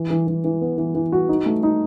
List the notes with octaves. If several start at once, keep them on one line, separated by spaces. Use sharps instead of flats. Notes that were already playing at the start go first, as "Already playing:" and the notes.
Already playing: E3
E3
E3
E3
B3
E3
E3
F#4
D#4
A3
D#4